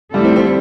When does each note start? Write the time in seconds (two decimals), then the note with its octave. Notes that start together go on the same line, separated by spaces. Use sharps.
0.14 F2 D3 G3 A3 E4 A4
0.24 C4
0.36 C4